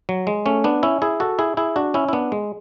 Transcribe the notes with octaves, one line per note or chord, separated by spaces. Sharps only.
F#3
G#3
A3 C#4
B3 D4
C#4 E4
E4 G#4
F#4 A4
E4 G#4
E4 G#4
D4 F#4
C#4 E4
E4
B3 D4
G#3